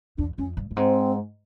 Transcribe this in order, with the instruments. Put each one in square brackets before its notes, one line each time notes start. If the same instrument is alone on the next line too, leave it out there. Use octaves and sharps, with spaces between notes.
[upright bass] E2 [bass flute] D4
[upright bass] F2 [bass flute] C#4
[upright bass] G2
G2
[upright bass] G#2 [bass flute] C4